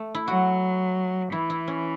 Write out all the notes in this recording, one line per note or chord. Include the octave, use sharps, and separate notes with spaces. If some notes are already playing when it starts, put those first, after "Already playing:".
Already playing: A3
E4
F#3 F#4
E3 E4
E4
C#4